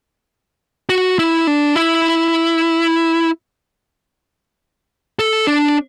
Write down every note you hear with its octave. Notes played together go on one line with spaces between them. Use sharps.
F#4
E4
D4
E4
A4
D4